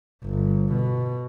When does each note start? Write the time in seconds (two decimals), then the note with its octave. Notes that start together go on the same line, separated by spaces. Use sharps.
0.25 G1
0.73 B2